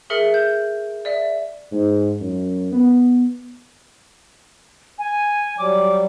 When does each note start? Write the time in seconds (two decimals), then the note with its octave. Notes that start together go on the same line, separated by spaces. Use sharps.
0.10 G#4 A#4 E5 C#7
0.34 G6
1.05 D5 E5
1.71 G#2
2.21 F#2
2.72 B3
4.98 G#5
5.58 F#3 G3 D6